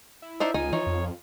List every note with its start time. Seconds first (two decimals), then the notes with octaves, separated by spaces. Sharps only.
0.22 E4
0.40 D4 D#4 C5 E5
0.54 C#2 D#4 F4 G#5
0.73 E3 D#4 C#5
0.87 F2